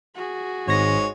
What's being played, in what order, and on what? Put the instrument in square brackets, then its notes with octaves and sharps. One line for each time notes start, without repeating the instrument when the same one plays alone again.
[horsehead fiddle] F#4 G#4
[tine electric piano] G#1 A#6 [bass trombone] G#2 [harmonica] G#3 C#5